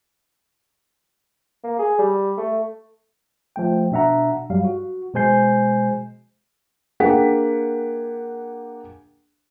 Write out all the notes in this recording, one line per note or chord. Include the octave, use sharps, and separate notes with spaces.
A#3
G#4
G3
A3
F3 A3 G5
B2 D4 E5 F#5 A#5
G2 F#3 G3 F5
F#4
B2 G#3 C5 G#5 G6 C7
A#3 D4 G#4 F#5 G5 B6